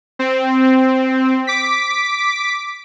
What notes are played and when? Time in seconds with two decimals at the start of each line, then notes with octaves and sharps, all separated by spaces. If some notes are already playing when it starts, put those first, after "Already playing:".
0.19 C4
1.47 D6 B6